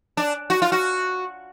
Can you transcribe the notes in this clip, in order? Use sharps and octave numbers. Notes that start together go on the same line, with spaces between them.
D4
F#4
F4
F#4